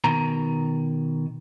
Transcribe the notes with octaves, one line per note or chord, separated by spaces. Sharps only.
B2 D#3 A#5